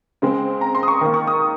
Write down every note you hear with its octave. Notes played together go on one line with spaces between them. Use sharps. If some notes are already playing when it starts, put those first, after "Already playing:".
C#3 G#3 C4
A#5
C6
D#6
C#6
D#3 A#3 D#6
C#6
D#6